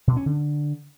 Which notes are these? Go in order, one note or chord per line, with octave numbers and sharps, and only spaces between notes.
B2
C#4
D3